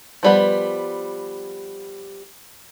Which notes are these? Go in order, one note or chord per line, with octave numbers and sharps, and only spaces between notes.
F3 G3 B3